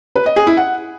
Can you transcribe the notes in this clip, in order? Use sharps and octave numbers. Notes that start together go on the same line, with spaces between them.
B4
D#5
G#4
E4
F#5